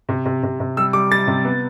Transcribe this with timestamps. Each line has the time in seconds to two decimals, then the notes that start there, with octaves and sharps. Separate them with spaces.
0.09 C3
0.25 C3
0.43 C3
0.60 C3
0.77 G3 E6
0.93 G3 D6
1.11 G3 A6
1.28 C3
1.45 B3